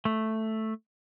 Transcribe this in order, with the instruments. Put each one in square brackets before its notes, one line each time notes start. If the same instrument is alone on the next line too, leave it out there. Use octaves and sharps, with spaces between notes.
[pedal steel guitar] A3